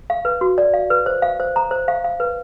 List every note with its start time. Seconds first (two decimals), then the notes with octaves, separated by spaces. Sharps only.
0.10 F5
0.25 B4
0.41 F#4
0.58 D5
0.74 F5
0.90 B4
1.06 C5
1.22 F5
1.40 C5
1.56 A#5
1.71 C5
1.88 F5
2.04 F5
2.20 B4